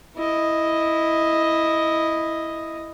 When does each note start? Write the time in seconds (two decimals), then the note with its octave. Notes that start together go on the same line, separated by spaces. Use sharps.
0.16 E4 D#5